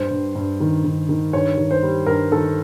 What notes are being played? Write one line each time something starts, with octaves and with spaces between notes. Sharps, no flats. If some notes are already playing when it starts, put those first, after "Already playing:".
Already playing: G2 C5
G2
G2
D#3
D#3
D#3
G2 C#5
D#3
C5
G3
G2 A#4
D#3 A4